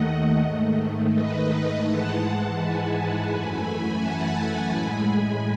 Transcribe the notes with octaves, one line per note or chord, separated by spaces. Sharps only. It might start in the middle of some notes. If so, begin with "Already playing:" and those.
Already playing: D#2 D#3 A3 D#5 F#5
G#2 D#3 A3
B4 D#5
G#2 E3 G#3 F#5 A5
G#5 B5
F#2 E3 A3
F#5 A5
A2 G#3 G#5 B5